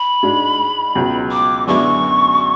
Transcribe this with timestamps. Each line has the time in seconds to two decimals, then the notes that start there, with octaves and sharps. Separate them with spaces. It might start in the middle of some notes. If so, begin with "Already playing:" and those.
Already playing: B5
0.23 G#2 G#3 D4
0.95 C#2 B2 F#3
1.32 D6
1.67 F#2 D3 G#3 B3 E4 C#6